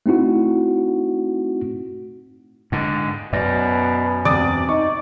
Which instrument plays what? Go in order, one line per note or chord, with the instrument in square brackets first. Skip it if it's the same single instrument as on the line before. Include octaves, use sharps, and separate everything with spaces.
[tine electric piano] A3 C4 D#4 E4 F#4
[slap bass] G#2 D3
[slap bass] F#2 [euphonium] B2 [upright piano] D5
[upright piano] E1 C3 D#6 [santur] D5
[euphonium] D#4 [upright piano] C#6